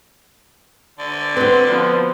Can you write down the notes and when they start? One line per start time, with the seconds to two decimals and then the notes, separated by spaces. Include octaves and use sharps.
0.98 D3
1.37 C4 F#4 B4
1.66 F3 B3 C4